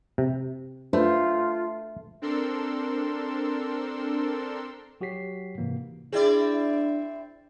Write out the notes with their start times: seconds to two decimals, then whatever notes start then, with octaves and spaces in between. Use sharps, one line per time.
0.18 C3
0.93 A3 D4 F4 B4 C5
2.22 C4 D4 A4 A#4 C6 E6
5.01 F#3 F#4 G4 C#5 B6 C7
5.58 G#2 C3 E3 A#3
6.13 C4 D4 E4 G#4 D5